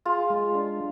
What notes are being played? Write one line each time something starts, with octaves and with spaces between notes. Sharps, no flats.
F4 G#4
G#3
D4